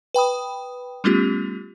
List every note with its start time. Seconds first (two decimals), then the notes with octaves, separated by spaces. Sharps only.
0.14 B4 G5 B5 D#6
1.04 G3 A3 B3 C#4 F4 G4